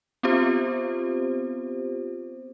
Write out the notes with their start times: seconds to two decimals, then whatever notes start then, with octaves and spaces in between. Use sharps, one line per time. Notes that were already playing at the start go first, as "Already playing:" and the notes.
0.23 B3 C4 F4 G4 C5